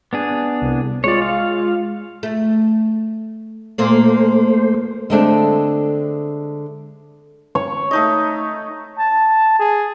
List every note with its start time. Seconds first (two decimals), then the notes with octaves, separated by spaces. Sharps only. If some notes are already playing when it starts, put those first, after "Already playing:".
0.13 B3 D4 G#4
0.62 C2
1.04 G#3 F4 C#5 D5
1.22 F5
2.23 A3
3.78 A#2 A3 A#3 A#4 C5
5.10 D3 G#3 A3 C4 D4
7.55 C#5
7.91 A3 D#4 D#5
8.99 A5
9.59 G#4